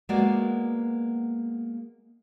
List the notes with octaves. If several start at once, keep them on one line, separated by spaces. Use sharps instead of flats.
G#3 A#3 B3 F#4 D5